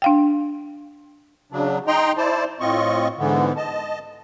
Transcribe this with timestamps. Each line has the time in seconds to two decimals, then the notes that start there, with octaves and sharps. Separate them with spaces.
0.02 D4 F5 G5
1.52 C#3 F#3 D4
1.87 D#4 D#5 G5 A#5 C6
2.17 E4 C5 D5 A5
2.60 A2 C4 F4 D#5 C#6
3.18 G#2 D3 E3 B3
3.57 D#5 A5